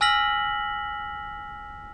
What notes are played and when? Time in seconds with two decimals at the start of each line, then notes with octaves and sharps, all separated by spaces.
0.01 G#5 E6 F6 A#6 B6 F#7